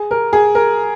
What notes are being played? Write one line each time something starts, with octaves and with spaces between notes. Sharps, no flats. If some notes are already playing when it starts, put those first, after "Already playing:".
Already playing: G#4
A#4
G#4
A#4